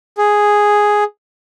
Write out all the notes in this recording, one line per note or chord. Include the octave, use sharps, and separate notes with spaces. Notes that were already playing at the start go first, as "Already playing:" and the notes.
G#4